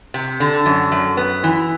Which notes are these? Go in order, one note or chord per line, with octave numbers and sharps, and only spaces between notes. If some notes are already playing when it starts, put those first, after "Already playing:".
C3
D3
F#2
F#2
B3
E3